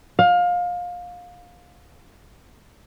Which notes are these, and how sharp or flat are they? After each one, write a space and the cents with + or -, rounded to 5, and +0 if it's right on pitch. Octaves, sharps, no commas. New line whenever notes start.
F5 +25